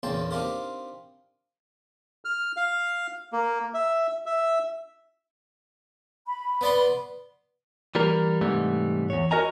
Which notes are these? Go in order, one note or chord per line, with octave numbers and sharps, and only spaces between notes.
A#1 E2 C#3 G5 A5 C6
C4 D4 D#4 F4 G4 A#4
F6
F5
A#3
E5
E5
B5
B3 D5 C6
E3 G3 A#3 A#4
G#2 C3 E3 G3 A3
E2 C#5
F#4 A#4 D#5 G#5 A#5